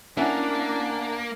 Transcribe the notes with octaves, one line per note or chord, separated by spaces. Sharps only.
A#3 C#4 D4 E4 E5 F#5 G#5